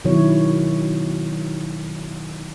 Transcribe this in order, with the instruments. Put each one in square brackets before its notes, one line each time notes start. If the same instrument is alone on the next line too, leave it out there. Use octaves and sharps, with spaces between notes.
[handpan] B2 D#3 F#3 E4 C#5